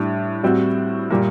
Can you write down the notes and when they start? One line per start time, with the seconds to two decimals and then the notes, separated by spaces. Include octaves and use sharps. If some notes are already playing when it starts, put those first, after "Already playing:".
Already playing: A2 G3 D4
0.43 A2 G3 C4 F#4
1.10 A#2 G3 A#3